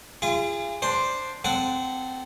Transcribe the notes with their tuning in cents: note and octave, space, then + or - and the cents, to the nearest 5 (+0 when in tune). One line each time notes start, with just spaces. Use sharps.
F4 -35 G#4 -30
D4 +0 C5 +0
C4 -20 A4 +0 F#5 +0